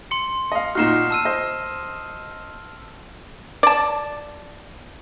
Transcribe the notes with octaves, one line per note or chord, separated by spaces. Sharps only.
C6 C#7
D#5 F5
A#2 D#4 F#4 F6 C7 E7
A5 E6 D#7
C5 D#5
D5 A5